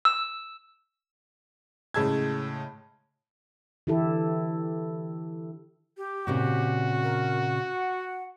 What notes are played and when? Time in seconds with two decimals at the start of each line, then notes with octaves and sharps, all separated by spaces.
0.05 E6
1.94 A2 C#3 G#3 A5 E6 G#6
3.87 D3 E3 E4 G4 A4
5.97 G4
6.27 A#2 C#3 C4 F#4
7.03 A#4
7.56 F#5